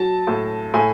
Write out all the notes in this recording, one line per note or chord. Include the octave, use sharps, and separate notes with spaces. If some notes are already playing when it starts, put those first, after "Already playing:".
Already playing: F#3 A5
A2
A2 G#5